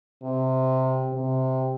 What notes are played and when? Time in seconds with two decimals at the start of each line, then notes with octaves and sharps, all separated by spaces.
0.23 C3
1.13 C3